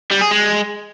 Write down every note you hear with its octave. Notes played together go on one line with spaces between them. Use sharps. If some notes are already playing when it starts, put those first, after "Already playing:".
G3
G#4
G#3